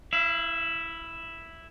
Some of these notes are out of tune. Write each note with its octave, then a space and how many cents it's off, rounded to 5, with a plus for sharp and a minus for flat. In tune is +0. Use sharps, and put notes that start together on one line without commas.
E4 +0 F5 -45